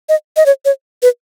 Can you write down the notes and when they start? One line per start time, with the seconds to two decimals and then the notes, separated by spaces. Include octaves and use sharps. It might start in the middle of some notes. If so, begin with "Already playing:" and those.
0.09 D#5
0.37 D#5
0.46 C#5
0.65 C#5
1.02 B4